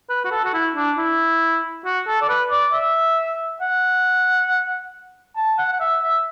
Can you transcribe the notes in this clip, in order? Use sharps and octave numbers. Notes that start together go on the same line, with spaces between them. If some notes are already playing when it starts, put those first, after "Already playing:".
B4
F#4
A4
F#4
E4
D4
E4
F#4
A4
D5
B4
D5
E5
F#5
A5
F#5
F#5
E5
E5